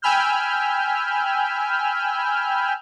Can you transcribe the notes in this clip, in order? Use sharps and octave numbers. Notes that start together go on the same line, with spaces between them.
G5 G#5 B5 E6 F6 G6